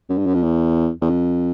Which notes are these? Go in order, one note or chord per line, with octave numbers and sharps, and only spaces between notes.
F#2
G2
F#2
F2
E2
E2
F2